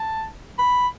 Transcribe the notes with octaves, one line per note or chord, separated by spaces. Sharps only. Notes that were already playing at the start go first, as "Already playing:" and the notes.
Already playing: A5
B5